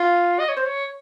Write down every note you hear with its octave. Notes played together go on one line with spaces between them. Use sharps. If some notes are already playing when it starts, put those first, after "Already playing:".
Already playing: F4
D#5
C#5
C5
C#5